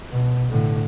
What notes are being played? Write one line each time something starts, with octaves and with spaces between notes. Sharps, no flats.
B2
A2 D3